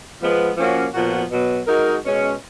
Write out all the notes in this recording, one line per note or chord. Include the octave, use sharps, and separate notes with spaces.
F3 G#3 B3
F3 A#3 C#4 F#4
A#2 F3 B3 F#4
B2 F#3 B3
G#3 D#4 F#4 A#4
B2 G#3 C#4